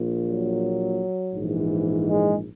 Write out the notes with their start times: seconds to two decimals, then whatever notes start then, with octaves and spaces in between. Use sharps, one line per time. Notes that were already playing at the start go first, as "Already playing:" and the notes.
Already playing: A#1 A#2
0.22 F#3
1.34 A#1 G#2 E3
2.08 G#3